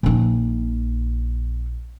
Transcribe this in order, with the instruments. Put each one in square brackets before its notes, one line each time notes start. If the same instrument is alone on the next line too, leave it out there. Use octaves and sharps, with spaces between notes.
[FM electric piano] A#1 [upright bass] A#3 D#4